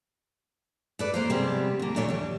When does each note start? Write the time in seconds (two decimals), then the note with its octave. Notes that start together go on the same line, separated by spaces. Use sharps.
0.99 A4 B4 D5
1.14 A#3 A#4 C5
1.30 C3 G3 G#3 B3 C4
1.79 D2 A#3
1.96 A#2 E3 A3 D4 A4 C#5
2.09 D#2 G3